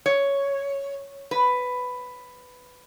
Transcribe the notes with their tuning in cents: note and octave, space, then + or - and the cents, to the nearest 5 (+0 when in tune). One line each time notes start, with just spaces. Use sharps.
C#5 +5
B4 +10